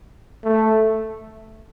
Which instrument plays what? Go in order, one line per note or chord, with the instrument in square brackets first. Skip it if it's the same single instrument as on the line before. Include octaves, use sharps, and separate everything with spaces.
[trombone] A3